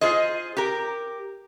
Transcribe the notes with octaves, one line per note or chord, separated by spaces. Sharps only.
F4 G#4 C5 D#5
G4 A#4